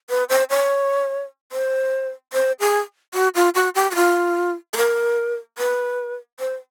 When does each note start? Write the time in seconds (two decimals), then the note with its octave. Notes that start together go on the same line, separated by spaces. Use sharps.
0.10 B4
0.29 C5
0.50 C#5
1.52 C5
2.33 C5
2.60 G#4
3.14 F#4
3.35 F4
3.55 F#4
3.75 G4
3.91 F#4
3.95 F4
4.73 A4
4.77 A#4
5.58 B4
6.40 C5